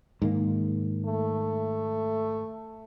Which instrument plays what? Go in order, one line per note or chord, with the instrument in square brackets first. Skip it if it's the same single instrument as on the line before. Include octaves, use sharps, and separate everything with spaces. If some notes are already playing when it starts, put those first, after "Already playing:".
[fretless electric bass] G#2 D#3 A#3
[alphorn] A3